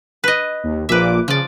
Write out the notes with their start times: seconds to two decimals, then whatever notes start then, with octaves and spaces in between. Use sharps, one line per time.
0.24 B4 D#5
0.63 D#2
0.89 A#1 A#2 B4 E5 D6
1.28 C#3 F3 D5